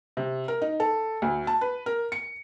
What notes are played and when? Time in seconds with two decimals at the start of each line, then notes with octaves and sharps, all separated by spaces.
0.17 C3
0.48 A#4
0.62 D#4
0.80 A4
1.22 D2
1.47 A5
1.61 B4
1.86 A#4
2.12 C#7